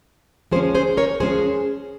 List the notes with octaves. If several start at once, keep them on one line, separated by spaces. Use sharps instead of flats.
F3 G#3 C#4 G#4 C5
G#4 C5
A#4 C#5
F3 G#3 C#4 G#4 C5